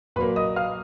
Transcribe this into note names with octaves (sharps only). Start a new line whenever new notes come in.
A#2 F#3 A#3 B4 B5
D#5 D#6
F5 F6